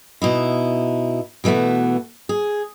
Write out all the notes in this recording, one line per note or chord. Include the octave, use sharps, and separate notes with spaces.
B2 D#4 E4
B2 E3 A3 B3 F#4
G#4